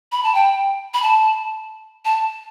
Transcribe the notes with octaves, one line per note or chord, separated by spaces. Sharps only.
B5
A5
G5
B5
A5
A5